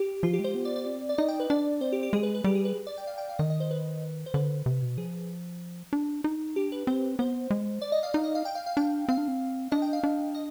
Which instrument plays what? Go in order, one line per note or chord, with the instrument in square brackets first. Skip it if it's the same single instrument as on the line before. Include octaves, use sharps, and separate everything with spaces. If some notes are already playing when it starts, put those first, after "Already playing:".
Already playing: [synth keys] G4
[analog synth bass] F3 [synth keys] F4
[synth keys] G4
[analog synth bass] G#3
[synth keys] C5
[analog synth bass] B3
[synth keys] D5
D5
[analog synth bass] C4
[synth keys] D5
[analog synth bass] D#4 [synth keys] D#5
[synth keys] G5
B4
[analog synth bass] D4 [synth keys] D5
[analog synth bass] C4 [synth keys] C5
[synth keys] G4
G4
[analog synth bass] G#3 [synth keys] G#4
[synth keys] B4
B4
[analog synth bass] G3 [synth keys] G4
[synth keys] G#4
B4
D5
G5
F5
G5
F5
[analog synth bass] D#3 [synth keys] D#5
[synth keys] D#5
C5
B4
C5
[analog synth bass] D3 [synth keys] B4
[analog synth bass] C3
B2
[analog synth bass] F3 [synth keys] G#4
[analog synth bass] D4
D#4
[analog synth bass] D4 [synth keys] G4
[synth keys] B4
[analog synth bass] C4 [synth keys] C5
[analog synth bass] B3 [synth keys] C5
[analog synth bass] G#3
[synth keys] D5
D#5
F5
[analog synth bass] D#4 [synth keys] F5
[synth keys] D#5
F5
G5
F5
F5
[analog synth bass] D4 [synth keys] G5
[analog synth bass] C4 [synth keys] F5
[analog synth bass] D4
C4
[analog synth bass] D4 [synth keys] D#5
[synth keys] G5
F5
[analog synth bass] D4
[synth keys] D#5